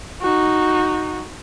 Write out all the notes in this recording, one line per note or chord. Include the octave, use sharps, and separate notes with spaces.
D#4 F#4